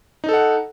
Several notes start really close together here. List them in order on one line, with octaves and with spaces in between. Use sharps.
D#4 A4 F#5